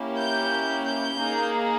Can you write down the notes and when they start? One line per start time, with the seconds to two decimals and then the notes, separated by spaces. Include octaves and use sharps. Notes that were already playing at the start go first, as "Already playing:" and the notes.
Already playing: A#3 C#4 E4 G4
0.17 G6
0.85 G6
1.18 A#3 D#4 G#4